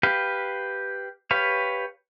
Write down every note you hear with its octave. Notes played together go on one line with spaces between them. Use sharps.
G4 B4 F5
G4 B4 C#5 F5